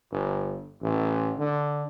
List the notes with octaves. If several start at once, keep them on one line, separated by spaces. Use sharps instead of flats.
G1
A1
D3